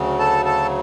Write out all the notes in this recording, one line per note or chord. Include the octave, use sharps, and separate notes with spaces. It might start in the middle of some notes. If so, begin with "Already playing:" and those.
Already playing: D2 C#3 F#3
A4 A5
A4 A5